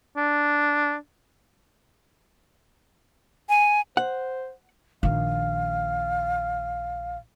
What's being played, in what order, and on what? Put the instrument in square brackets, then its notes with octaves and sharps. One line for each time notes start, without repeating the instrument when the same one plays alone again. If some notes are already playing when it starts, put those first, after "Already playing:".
[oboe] D4
[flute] G#5
[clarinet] C5 [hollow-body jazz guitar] F#5
[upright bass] A#1 D#3 [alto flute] F5